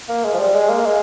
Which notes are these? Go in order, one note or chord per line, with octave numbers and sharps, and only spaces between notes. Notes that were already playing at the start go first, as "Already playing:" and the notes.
A#3
G#3
F3
G3
G#3
A#3
G#3